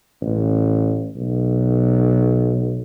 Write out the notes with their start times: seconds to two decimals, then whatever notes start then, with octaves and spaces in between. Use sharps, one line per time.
0.22 A1
1.16 B1